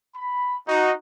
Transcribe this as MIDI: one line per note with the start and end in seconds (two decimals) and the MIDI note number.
0.15 0.57 83
0.68 0.93 63
0.68 0.93 66